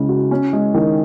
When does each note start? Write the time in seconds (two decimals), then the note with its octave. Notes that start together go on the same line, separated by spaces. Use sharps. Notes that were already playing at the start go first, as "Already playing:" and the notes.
Already playing: C#3 G#3 C#4
0.09 F#4
0.31 C#4
0.53 G#3
0.74 D#3